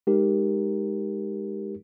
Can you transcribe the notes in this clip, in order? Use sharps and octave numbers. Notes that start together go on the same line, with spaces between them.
G#3 D#4 G4 A#4